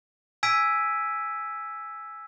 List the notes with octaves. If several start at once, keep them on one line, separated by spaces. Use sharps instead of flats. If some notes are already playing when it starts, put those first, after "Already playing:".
G#5 E6 G#6 B6 D7 D#7